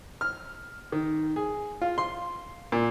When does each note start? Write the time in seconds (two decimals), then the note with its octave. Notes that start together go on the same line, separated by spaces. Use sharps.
0.21 F6
0.92 D#3
1.36 G#4
1.81 F4
1.98 C6
2.72 A#2